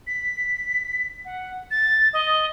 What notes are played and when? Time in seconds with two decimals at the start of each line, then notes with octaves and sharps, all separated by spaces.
0.07 B6
1.25 F#5
1.71 A6
2.13 D#5